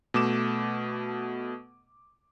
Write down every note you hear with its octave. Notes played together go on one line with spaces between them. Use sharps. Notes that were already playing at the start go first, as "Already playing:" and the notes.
B2 A3 D6 E7